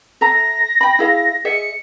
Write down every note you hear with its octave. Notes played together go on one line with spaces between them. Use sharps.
A4 E5 A#5 A#6
G5 B5
E4 G#4 F5
G#4 D#5 E5 C#7